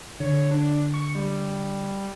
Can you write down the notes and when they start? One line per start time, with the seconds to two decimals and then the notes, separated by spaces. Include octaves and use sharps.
0.20 D3 C#5
0.51 D4
0.94 C#6
1.15 G3